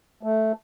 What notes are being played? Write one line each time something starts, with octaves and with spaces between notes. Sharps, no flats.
A3